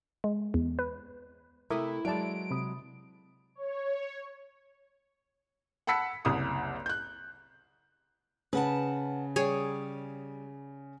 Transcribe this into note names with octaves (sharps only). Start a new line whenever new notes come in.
G#3
E2
B4
C3 A3 E4 A#4 E5 D6 D#6
F#3 G#3 E4 D5 A5 D7
C3 B5 D#6
C#5
F#5 A5 B5 E6 B6 C#7
F#1 C2 D#6
F#6 G6
C#3 B4 F#5 A5
G3 G#4 C#5